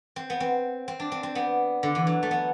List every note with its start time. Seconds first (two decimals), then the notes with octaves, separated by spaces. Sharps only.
0.16 C4
0.30 B3
0.40 C4
0.88 C4
1.00 D4
1.12 C4
1.23 C4
1.35 B3
1.83 D3
1.95 E3
2.07 F#3
2.23 A3
2.31 B3